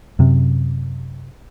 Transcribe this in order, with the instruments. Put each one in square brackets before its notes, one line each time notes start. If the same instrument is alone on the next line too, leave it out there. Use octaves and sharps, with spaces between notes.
[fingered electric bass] F#2 C3